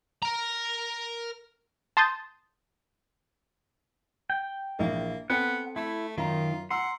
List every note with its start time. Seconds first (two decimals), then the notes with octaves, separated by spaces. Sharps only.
0.23 A#4 A#5
1.97 A5 C6 D#6 G6 A6
4.30 G5
4.79 A#1 E3 A#3
5.30 B3 C4 A4 F#5
5.76 A3 E4
6.18 F#2 D#3 F4 A#5
6.71 F#5 A#5 C6 E6